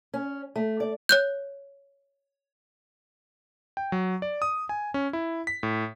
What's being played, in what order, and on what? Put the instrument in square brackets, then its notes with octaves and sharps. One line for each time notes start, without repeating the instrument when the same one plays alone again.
[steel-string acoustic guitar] C#4
A3
D5
[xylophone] C#5 F#6 G6
[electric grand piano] G5
F#3
D5
D#6
G#5
C#4
E4
B6
A2